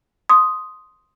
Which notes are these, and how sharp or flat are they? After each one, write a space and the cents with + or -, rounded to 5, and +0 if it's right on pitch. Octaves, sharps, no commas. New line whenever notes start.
C6 +0 D#6 +0